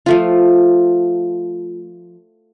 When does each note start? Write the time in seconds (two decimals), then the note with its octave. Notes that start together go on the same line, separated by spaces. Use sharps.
0.06 F3 A3 F4